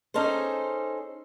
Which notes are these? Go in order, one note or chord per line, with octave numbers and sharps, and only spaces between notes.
C#4 D#4 G#4 A4 C5